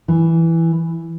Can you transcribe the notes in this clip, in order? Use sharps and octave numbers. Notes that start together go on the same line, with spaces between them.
E3